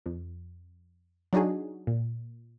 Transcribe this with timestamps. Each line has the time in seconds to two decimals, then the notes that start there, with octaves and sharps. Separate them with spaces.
0.06 F2
1.33 F#3 D4 D#4 F#4 G#4
1.87 A#2